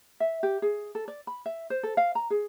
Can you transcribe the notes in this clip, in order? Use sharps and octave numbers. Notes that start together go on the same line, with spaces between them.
E5
G4
G#4
A4
D5
B5
E5
C5
A4
F5
A#5
G#4